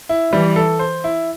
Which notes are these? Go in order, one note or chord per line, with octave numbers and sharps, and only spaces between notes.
E4
E3 G3
A4
C5
E4